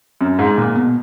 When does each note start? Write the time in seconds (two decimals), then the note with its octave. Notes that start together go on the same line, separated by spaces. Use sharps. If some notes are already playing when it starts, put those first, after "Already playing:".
0.21 F#2
0.39 G#2
0.58 A#2
0.75 B2